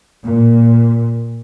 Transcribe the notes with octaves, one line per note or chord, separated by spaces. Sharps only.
A#2